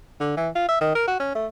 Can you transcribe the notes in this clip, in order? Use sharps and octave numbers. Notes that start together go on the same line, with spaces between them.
D3
E3
F4
E5
D#3
A#4
F#4
C#4
A3